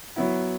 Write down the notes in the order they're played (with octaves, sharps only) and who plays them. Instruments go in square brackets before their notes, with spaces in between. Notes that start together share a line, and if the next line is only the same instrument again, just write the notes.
[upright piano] F#3 B3 E4